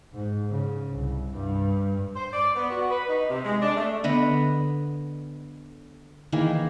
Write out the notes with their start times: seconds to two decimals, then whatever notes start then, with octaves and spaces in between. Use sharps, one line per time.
0.13 G#2
0.50 C#3
0.93 C2
1.31 G2
2.15 C5
2.32 D5
2.56 B3
2.70 F#4
2.90 B4
3.08 D#4
3.29 C3
3.44 G#3
3.62 D4
3.76 A3
4.04 D3 B3 D#5 B5
6.32 D#3 E3 A#3 G#4